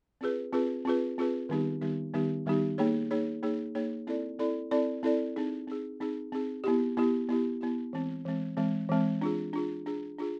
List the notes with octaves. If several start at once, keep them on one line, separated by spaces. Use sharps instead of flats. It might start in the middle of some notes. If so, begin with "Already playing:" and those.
C4 F4 G#4 B4
C4 F4 G#4 B4
C4 F4 G#4 B4
C4 F4 G#4 B4
D#3 G3 B3 D#4 G4
D#3 G3 B3 D#4 G4
D#3 G3 B3 D#4 G4
D#3 G3 B3 D#4 G4
A#3 D#4 G#4 C#5
A#3 D#4 G#4 C#5
A#3 D#4 G#4 C#5
A#3 D#4 G#4 C#5
C4 E4 A4 D5
C4 E4 A4 D5
C4 E4 A4 D5
C4 E4 A4 D5
C4 D#4 G#4
C4 D#4 G#4
C4 D#4 G#4
C4 D#4 G#4
B3 E4 G4
B3 E4 G4
B3 E4 G4
B3 E4 G4
E3 G#3 C4
E3 G#3 C4
E3 G#3 C4
E3 G#3 C4
D4 F4 G#4
D4 F4 G#4
D4 F4 G#4
D4 F4 G#4